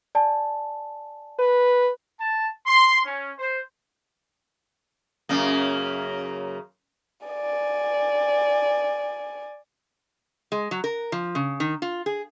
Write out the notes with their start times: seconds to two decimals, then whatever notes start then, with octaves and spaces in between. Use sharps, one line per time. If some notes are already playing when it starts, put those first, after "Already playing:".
0.15 D5 G#5 A5
1.39 B4
2.21 A5
2.65 C6
3.05 C#4
3.38 C5
5.29 F#2 C#3 A#3
7.27 D5 G#5
10.52 G#3
10.71 F#3
10.84 A#4
11.12 F3
11.35 C#3
11.60 D#3
11.82 F4
12.06 G#4